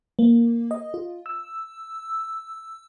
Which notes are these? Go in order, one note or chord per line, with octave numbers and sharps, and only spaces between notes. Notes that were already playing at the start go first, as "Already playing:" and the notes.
A#3
D#5
F4
E6